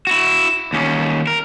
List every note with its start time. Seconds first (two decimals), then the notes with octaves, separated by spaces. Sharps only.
0.07 E4 F#4
0.73 D#2 C#4
1.27 A#4